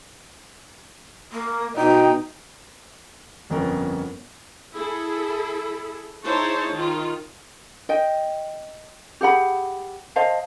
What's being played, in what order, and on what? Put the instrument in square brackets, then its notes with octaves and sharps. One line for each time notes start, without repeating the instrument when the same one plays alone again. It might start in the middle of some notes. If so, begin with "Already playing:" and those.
[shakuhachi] A#3
[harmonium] B2 [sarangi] D#4 [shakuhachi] G5
[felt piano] G1 F2 B3 C#4 A#4
[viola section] E4 G#4 A4
D#4 E4 G#4 C5 C#5 A5
D#3 F4
[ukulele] D#5 G5
G4 G#4 F#5 B5
C5 D#5 F5 A5